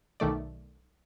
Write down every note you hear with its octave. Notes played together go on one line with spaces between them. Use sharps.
B1 D#3 A3 D5